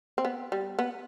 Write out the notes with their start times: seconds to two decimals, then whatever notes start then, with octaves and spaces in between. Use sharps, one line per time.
0.18 C4
0.25 B3
0.52 G3
0.79 B3